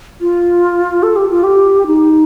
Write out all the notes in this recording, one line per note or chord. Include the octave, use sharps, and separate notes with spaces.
F4
A4
G4
F4
G4
D#4